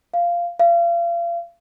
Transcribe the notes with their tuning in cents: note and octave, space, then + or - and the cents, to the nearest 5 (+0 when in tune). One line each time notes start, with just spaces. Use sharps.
F5 -10
F5 -35